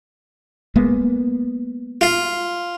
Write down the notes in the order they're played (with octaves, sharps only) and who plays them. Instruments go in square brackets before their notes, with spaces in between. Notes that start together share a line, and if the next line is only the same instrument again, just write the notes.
[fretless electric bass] G#3 A#3 B3
[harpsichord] F4